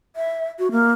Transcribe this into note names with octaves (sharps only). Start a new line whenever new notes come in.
E5
F#4
A#3